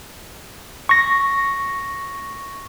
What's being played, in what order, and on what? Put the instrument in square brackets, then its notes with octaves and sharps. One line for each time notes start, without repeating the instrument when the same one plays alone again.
[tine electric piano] C#6 A#6